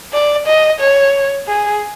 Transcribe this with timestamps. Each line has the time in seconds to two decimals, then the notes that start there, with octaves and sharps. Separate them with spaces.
0.13 D5
0.47 D#5
0.80 C#5
1.48 G#4